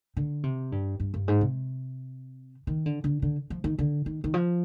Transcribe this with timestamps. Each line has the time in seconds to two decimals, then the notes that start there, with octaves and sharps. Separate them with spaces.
0.17 D3
0.43 C3
0.72 G2
1.00 G2
1.14 G2
1.28 G#2
1.41 C3
2.67 D#3
2.86 D3
3.04 D3
3.22 D3
3.50 F3
3.64 D#3
3.78 D3
4.06 D#3
4.24 D#3
4.34 F3